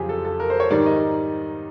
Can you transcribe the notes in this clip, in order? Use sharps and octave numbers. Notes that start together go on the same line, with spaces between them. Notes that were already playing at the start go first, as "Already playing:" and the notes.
Already playing: F2 C#3 F#3 F4 G4 G#4
A4
A4
A#4
C5
C#5
G#2 D#3 G3 D5
D#5